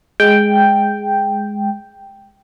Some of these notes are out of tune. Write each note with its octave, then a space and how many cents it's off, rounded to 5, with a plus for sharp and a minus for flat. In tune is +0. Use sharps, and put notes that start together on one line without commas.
G#3 +0 G5 +0